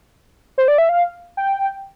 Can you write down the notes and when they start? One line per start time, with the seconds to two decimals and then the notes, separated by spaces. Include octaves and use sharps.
0.58 C5
0.68 D5
0.78 E5
0.89 F5
1.37 G5